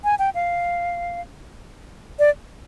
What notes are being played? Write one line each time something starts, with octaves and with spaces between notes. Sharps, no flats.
G#5
G5
F5
D5